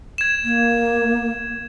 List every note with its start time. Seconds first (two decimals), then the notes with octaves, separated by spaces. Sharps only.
0.18 G#6 E7
0.44 A#3